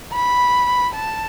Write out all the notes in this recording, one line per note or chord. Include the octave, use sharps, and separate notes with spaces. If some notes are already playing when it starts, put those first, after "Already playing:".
B5
A5